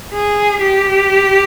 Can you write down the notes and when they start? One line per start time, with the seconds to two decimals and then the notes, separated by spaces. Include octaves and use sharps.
0.14 G#4
0.62 G4